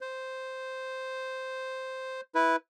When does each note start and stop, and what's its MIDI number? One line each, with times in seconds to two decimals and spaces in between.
0.01 2.21 72
2.35 2.56 64
2.35 2.56 71